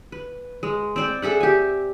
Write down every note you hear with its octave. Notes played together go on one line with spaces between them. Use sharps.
B4
G#3
C4 D5 G5
G#4 A4 E5 F#5
G4 G#5